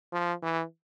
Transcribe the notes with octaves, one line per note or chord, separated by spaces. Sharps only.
F3
E3